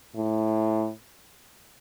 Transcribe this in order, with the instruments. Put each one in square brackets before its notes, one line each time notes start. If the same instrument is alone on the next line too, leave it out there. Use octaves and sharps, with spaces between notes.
[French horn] A2